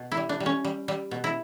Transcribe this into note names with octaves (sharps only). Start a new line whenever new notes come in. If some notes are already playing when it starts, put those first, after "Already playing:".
Already playing: B2
E4
G3
D4
G3
C#4
G3
G3
B2
E4